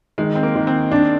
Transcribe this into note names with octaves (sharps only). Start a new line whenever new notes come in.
D#3 G#3
C4
A#3
D#3
C4
D4